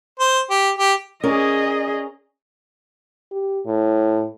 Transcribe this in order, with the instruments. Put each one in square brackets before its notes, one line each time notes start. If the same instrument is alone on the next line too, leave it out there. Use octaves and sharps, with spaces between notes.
[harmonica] C5
G4
G4
[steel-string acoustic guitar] C#4 A#4 D5 [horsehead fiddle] G#4 D#5
[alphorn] G4
A2